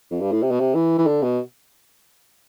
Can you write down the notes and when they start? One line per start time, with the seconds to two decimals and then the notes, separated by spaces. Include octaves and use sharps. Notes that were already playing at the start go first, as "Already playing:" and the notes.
0.11 F2
0.21 G2
0.32 A2
0.43 C3
0.51 B2
0.60 C3
0.75 E3
0.98 E3
1.06 D3
1.23 B2